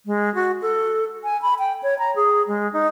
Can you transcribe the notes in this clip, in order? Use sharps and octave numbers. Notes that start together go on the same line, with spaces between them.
G#3
F#4
A4
G#5
B5
G5
C#5
A#5
G#4
G#3
D#4